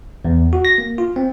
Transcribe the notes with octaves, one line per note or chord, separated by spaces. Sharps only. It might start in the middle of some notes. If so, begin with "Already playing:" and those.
E2
F#4
A#6
A#3
F4
C4